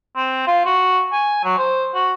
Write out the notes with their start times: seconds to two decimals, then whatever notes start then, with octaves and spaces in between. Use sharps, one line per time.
0.17 C4
0.47 F4
0.66 F#4
1.12 G#5
1.44 F#3
1.58 C5
1.94 F#4